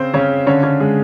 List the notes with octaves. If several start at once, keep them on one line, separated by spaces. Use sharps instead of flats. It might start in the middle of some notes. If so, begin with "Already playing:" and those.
Already playing: C#3 C4 C5
C#3 C#4 C#5
D3 C#4 C#5
C#4 C#5
G#3 G#4